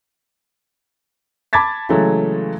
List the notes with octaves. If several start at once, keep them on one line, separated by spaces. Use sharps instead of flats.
A5 B5 D6 G#6 A6 B6
C#3 E3 F#3 G#3 A3